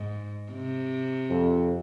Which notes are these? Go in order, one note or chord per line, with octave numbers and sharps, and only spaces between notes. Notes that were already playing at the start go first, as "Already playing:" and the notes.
Already playing: G#2
C3
F2